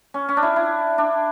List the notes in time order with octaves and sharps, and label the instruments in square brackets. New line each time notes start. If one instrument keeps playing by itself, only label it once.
[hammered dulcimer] C#4
C#4
D4
E4
E4
D4